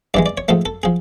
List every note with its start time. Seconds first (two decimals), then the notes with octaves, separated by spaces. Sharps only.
0.14 G2 E3 G#3 D5
0.26 D5
0.38 C#5
0.48 G#2 F3 A3 A4
0.66 A4
0.83 F3 G#4